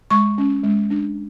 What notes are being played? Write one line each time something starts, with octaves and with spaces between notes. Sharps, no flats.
G#3 C#6
C#4
G#3
D4